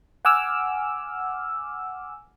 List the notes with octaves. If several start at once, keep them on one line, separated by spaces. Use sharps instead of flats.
F#5 G#5 D6 E6 F6